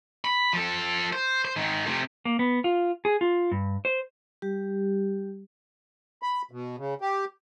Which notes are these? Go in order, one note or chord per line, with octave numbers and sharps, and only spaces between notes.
B5
F3 A4
C5
C5
G#2 D#3
C3 A3
A#3
B3
F4
G#4
F4
G2
C5
G3 G4
B5
B2
C#3
G4